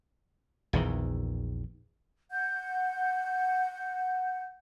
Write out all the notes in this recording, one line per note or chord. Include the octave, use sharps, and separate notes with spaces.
A#1 E2 D#3 E3
F#5 G6